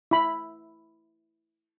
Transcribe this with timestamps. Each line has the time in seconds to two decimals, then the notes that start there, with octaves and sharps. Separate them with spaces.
0.11 E4 B5